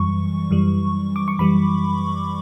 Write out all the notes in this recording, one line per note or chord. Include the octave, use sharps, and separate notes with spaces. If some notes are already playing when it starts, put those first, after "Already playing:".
Already playing: F#2 E3 G3 C#6
F#2 E3 G3
D6
C#6
F#2 E3 G3 B5